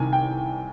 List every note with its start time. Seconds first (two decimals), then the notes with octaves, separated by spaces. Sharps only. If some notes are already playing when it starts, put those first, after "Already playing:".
Already playing: C2 C3 D#3 G#5
0.13 G5